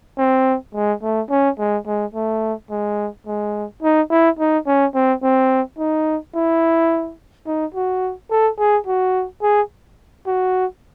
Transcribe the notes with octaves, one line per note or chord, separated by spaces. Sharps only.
C4
G#3
A3
C#4
G#3
G#3
A3
G#3
G#3
D#4
E4
D#4
C#4
C4
C4
D#4
E4
D#4
F#4
A4
G#4
F#4
G#4
F#4